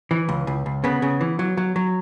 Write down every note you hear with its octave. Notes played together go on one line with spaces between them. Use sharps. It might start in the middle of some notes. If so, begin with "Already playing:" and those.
E3
C#2
C#2
C#2
C#3 B3
C#3
E3
F#3
F#3
F#3